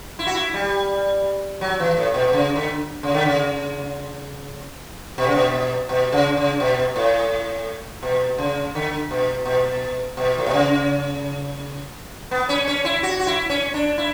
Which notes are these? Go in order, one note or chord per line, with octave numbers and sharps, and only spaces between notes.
E4
F#4
E4
G3
F#3
E3
A2
B2
B2
C#3
D3
C#3
D3
C#3
B2
C#3
B2
B2
C#3
C#3
B2
A2
B2
C#3
D3
B2
B2
B2
A2
B2
C#3
B3
C#4
C#4
E4
F#4
F#4
E4
C#4
D4
E4